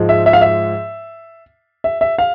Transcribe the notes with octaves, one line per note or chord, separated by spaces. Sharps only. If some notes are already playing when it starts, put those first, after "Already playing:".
Already playing: G#2 F3 G#3
E5
E5
F5
E5
E5
E5
F5